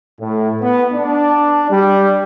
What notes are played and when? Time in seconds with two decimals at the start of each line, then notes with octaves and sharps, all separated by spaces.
0.20 A2
0.61 B3
0.93 D4
1.71 G3